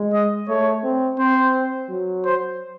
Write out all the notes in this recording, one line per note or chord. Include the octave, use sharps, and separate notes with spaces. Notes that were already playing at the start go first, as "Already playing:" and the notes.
Already playing: G#3
D#5
A3 C#5
C4
C4 C5
F#3
C5